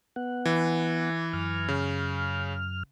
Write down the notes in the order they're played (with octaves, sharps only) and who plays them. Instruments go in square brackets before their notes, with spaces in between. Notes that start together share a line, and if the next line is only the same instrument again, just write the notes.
[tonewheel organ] B3 F#5
[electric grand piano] E3
[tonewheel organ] F#2 F6
[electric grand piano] C#3